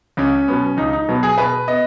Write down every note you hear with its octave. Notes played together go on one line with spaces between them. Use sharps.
C#2 C#4
B2 F#3 B3
C#2 D#4
D#4
B2 F#3 B3
G#4
B2 B4
B3 D#5